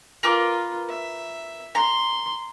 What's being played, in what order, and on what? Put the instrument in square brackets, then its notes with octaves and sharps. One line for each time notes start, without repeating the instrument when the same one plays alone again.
[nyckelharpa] F4 [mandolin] A#4 B4 D6
[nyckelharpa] E5
[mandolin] A#5 [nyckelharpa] C6